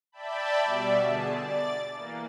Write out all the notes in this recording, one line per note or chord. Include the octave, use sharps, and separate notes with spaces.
D5 E5 G5 A5 B5
B2 G3 D5 E5
B2 D3 G#4 A5
D5 A6
E3 A#3